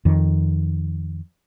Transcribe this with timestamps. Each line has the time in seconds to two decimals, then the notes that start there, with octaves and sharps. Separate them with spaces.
0.05 F2 D#3